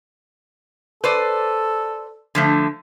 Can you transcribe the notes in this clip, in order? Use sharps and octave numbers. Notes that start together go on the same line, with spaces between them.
A4 B4 C5 D5
D3 F3 A3